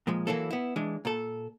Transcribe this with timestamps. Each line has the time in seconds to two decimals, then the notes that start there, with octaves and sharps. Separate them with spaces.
0.07 A#2 F3 G#3
0.27 E3 F#3 A#3 E4 A4
0.51 B3 E4
0.76 E3 G#3 D4
1.05 A#2 A4